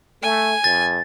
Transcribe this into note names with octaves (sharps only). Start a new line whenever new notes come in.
A3 G#5
F2 A6